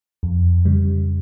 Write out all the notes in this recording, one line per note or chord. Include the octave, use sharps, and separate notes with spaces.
F2
C#3 G3